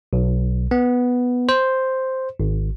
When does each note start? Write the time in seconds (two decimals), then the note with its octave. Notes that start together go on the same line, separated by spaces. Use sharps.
0.13 B1
0.71 B3
1.49 C5
2.40 G#1